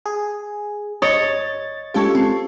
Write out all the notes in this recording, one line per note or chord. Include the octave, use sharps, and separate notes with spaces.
G#4
G1 C#5 D#5 A6
G#3 C#4 F4 G4 A4 C#6
C4